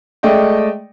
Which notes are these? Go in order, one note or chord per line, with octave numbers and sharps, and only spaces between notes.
G#3 A3 D5 D#5 G5